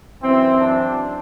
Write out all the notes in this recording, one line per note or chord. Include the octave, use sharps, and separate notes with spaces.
F#2 E3 C4
D4